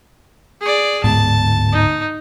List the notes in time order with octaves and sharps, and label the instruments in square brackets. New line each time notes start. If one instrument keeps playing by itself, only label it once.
[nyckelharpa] G#4 D5
[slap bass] D1 G#2 B3 [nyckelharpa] A5
[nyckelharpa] D#4